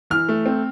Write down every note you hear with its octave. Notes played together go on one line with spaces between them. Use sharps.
E3 F6
A3
C4